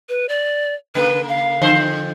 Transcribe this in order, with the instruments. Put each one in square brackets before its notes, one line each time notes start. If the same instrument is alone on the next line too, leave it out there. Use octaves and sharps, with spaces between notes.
[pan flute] B4
D5
[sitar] C#3 A#3 [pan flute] B4
[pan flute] F5
[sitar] F2 D3 C5